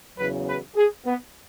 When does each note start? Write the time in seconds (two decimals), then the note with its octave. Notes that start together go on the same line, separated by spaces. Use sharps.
0.17 E2 C#3 F#3 B4
0.47 B4
0.76 G#4
1.06 B3